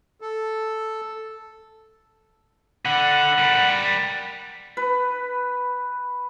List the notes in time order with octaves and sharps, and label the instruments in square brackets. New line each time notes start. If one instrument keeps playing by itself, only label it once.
[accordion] A4
[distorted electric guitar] D3 [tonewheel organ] F#5 B5
[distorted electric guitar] G3 A#4
[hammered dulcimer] B4